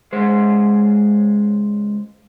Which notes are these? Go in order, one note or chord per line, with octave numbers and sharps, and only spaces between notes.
C#2 G#3 C5